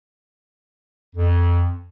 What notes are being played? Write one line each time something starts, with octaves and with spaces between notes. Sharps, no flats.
F2